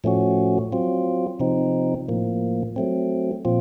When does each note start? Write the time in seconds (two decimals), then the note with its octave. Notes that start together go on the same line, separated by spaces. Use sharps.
0.04 A2 F3 A3 C#4 F#4
0.72 F#3 C4 F4
1.40 C3 F3 C4 D#4
2.08 A2 F3 A#3
2.76 F#3 A3 C4
3.45 A#2 F3 C4 F4